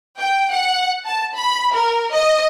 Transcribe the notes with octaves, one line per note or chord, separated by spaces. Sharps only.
G5
F#5
A5
B5
A#4
D#5